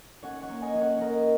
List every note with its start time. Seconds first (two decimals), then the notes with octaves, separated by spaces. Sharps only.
0.23 C#4 C#5 F#5
0.42 C#5 F#5
0.49 A#3
0.62 D#5 G#5
0.75 C#4
0.81 C#5 F#5
0.99 C#4 A#4 D#5